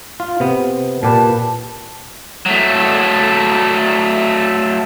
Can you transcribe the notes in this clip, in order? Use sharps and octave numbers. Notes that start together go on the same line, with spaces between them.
F4
C3 B3
A#2 G4 B4 A5
F#3 A3